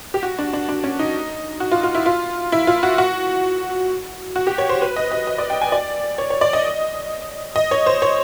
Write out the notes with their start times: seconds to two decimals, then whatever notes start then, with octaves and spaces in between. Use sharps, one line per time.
0.14 G4
0.23 F#4
0.39 D4
0.53 D4
0.69 D4
0.84 C#4
0.99 D#4
1.60 F#4
1.72 F4
1.83 F4
1.95 E4
2.06 F4
2.52 E4
2.67 F4
2.83 F#4
2.98 F#4
4.36 F#4
4.47 G4
4.58 C#5
4.69 C5
4.82 B4
4.96 D#5
5.12 D#5
5.27 D#5
5.38 D5
5.50 G5
5.61 G#5
5.72 D5
6.18 C#5
6.30 C#5
6.41 D5
6.53 D#5
7.56 D#5
7.71 C#5
7.86 C5
8.02 C#5